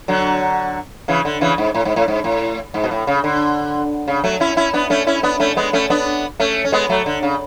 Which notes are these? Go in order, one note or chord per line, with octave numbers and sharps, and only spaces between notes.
D3 F#3
C#3 E3
D3
C#3 E3
G#2
A2
G#2
A2
G#2
A2
G#2
B2
A2
C#3
D3
C#3
F#3 A3
C#4 E4
C#4 E4
B3 D4
A3 C#4
C#4 E4
B3 D4
A3 C#4
G#3 B3
A3 C#4
B3 D4
A3 C#4
C#4
G#3 B3
F#3 A3
D3
C#3